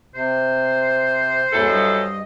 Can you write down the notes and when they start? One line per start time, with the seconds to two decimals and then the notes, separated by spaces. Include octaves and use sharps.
0.15 C3 C5
1.53 E2 G#2 E3 F#3 A4
1.68 G2 D#5